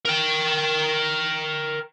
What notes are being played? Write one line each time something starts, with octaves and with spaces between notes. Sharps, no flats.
A#4 G5